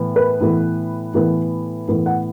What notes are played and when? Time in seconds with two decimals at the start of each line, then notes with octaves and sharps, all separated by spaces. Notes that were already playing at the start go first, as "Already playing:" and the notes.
Already playing: A2 E3 B3
0.16 B4
0.41 A2 E3 B3
1.14 A2 E3 B3
1.88 A2 E3 B3
2.06 F#5